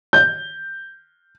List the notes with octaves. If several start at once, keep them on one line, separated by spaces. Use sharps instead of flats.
G6